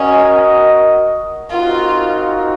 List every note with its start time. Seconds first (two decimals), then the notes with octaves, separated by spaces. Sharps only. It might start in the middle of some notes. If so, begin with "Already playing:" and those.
Already playing: C#4 F#4 A#4 D#5
1.50 C4 D#4 F4 F#4 A#4 F5